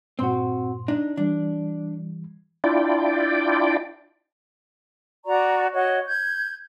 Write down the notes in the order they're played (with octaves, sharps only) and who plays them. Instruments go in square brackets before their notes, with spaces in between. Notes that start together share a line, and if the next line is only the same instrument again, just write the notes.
[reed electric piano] G2 A#2 C6 [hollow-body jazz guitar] C4 F#4
[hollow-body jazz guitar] D4 D#4
[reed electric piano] E3 G3 [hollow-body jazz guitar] D4
[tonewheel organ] D4 E4 F4 D5 G5
[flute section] F#4 D5 A#5 C#6
F#4 C#5 D#5
G6 G#6